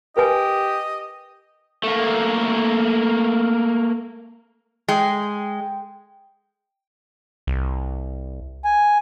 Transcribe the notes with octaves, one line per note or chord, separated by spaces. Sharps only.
G4 A#4 B4 D#5 G#5
A3 A#3
G#3 G5
C2
G#5